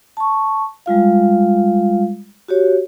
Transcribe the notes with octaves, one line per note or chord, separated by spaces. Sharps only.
A5 C#6
G3 G#3 F4 F5
F#4 G4 C#5